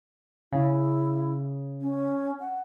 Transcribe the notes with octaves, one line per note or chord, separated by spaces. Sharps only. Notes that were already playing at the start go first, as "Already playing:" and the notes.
C#3 E4
C#4
F#5